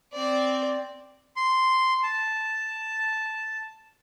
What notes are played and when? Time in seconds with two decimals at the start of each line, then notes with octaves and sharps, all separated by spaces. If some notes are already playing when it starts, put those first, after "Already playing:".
0.13 C4 D5
1.36 C6
2.03 A5